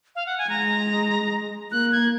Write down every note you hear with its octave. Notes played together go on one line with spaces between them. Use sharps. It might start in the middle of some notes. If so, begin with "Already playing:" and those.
F5
F#5
G#5
G#3 A#5
A#3 F#6
G#6